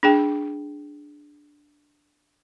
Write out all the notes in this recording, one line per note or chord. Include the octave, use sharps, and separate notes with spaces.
D4 G#4 G5